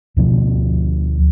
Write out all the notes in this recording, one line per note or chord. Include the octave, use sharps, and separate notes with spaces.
D2 B2 F3 B3